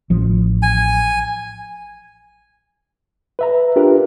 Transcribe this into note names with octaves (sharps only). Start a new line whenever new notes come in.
A1 F3
G#5
B4 E5 A#5
D4 F4 G4 A#4 B4